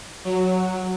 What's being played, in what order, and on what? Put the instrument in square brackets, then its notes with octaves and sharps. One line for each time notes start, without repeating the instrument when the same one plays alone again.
[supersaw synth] F#3